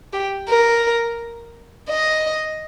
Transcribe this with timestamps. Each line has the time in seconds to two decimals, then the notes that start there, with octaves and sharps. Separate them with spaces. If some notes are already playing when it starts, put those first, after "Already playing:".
0.13 G4
0.49 A#4
1.90 D#5